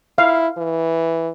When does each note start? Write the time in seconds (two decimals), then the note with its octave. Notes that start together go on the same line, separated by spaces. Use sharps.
0.18 E4 F5
0.57 E3